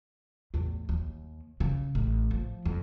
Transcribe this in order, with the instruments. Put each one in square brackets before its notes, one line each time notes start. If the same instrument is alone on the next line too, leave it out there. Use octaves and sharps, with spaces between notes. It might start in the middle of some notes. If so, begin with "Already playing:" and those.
[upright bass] E2 A2
D#2
C#3
A1
F3
F2